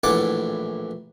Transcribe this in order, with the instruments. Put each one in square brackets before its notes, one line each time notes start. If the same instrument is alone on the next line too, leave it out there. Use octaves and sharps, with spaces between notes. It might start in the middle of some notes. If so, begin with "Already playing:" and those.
[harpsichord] A#1 A2 E3 D5 F#5 D6